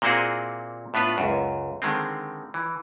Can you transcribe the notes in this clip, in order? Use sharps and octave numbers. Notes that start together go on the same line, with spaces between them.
A#2 A#3 C4 E4 F#4 G#4
A2 B3 D4 F4 B4
C#2 F#2
D3 D#3 G#3 C4
E3